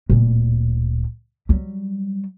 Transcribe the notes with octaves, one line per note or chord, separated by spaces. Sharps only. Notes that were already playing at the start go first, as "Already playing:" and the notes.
D1 A#2
F#3 G3